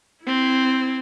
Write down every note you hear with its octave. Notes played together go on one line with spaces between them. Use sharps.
C4 E4